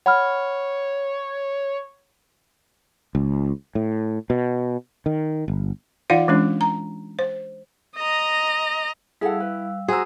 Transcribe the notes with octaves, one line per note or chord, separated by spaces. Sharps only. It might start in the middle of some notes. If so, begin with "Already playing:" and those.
C#5 F#5 B5 F6
C#2
A2
B2
D#3
G1
E3 D#4 F4 D5 F5 F#5
E3 G#3 C#4 D4
A#5
C5
D#5 A#5
G3 E4 G#4 A4 F5 F#5 E6
B4
F#4 G#4 C5 A#5 E6